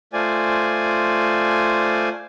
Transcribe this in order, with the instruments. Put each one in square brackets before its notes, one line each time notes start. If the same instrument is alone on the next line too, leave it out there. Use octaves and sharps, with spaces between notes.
[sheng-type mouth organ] A3 F4 C5 D5 G#5